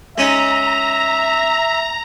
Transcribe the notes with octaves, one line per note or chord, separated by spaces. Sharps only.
G#3 C#4 D#4 E5 A#5